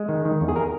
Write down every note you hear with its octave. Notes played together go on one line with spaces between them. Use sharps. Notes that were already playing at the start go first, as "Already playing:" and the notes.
Already playing: G#3
D#3
D#3
E2
G#4
A#4